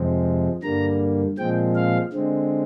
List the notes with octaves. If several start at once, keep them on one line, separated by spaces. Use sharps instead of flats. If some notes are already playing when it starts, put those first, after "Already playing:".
Already playing: F2 C3 F3 G#3 C4
G2 D3 G3 A#3 A#5
A#2 F3 G#3 C4 G5
F5
D3 G#3 C4